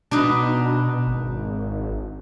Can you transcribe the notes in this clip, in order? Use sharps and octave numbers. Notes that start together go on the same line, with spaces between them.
B2 D4 D#4 B4
G#1